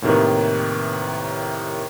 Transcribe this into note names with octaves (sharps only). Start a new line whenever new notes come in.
D#2 A2 C3 D#3 E3